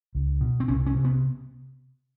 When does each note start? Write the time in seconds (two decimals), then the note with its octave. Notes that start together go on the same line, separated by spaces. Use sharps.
0.15 C#2
0.41 B2
0.60 C4
0.68 C2 C#4
0.87 C#4
0.96 C3
1.05 B3